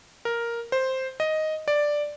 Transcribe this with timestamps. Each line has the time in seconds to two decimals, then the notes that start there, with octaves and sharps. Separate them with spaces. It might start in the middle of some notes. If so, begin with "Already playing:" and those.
0.25 A#4
0.72 C5
1.20 D#5
1.68 D5